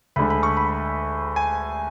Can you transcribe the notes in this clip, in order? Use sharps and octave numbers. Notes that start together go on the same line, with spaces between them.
D2 D3 G#3 B5
B5
C#6
B5
G#5